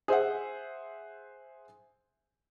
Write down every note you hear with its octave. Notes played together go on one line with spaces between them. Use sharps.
G#4 C5 E5 F#5